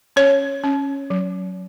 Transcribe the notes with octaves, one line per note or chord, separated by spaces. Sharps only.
C#4 C#5
C#4
F#3